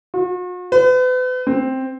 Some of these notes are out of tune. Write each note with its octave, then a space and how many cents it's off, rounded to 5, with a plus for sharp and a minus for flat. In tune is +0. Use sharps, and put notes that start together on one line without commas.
F#4 -45
B4 +40
C4 +5